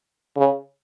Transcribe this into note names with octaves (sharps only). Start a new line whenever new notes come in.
C#3